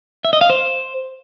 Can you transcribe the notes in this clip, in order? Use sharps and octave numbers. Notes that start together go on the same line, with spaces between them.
E5
D#5
F5
C5